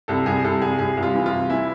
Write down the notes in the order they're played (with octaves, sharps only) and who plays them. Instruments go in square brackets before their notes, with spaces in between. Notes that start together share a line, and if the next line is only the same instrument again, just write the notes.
[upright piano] C2 [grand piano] A4
[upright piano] C2 [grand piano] G#4
[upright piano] C2 [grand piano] A4
[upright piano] C2 [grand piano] G#4
[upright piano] C2 [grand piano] G#4
[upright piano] C2
[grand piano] F4
[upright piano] E3
[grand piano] F4
[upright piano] C2
[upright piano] E3 [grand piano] E4